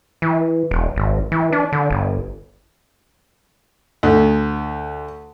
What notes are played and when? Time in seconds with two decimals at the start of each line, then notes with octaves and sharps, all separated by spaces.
0.22 E3
0.71 E1
0.96 G#1
1.32 E3
1.52 D4
1.72 D3
1.91 G1
4.03 D2